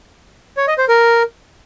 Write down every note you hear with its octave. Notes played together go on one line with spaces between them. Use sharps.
C#5
D#5
C5
A#4